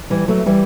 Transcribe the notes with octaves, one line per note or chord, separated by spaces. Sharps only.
E3 G3
F#3 A3
E3 G3